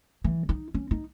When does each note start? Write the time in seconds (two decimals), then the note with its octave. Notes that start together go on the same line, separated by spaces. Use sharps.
0.24 E3
0.49 D#4
0.74 C#4
0.91 D#4